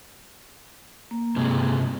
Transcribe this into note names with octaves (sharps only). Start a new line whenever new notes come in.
A#3
G2 C3 G#3